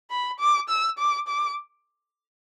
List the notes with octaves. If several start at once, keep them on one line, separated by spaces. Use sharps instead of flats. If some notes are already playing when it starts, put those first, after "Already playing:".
B5
D6
E6
D6
D6